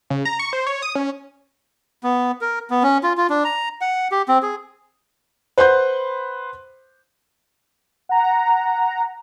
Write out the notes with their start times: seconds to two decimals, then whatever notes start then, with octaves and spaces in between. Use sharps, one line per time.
0.10 C#3
0.25 A#5
0.39 C#6
0.53 C5
0.66 C#5
0.82 D#6
0.95 C#4
2.04 B3
2.41 A#4
2.70 B3
2.83 C#4
3.03 F4
3.18 F4
3.30 D4
3.45 A#5
3.81 F#5
4.12 G4
4.28 C4
4.43 G#4
5.58 B4 C5 F#5 C6 G6
8.09 F#5 A#5